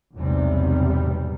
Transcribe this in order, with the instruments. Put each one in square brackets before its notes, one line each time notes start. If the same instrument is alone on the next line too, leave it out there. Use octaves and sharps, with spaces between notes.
[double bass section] B1 E2 G#2 C3 G3